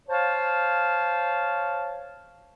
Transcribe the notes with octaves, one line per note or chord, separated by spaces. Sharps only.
C5 C#5 F5 A5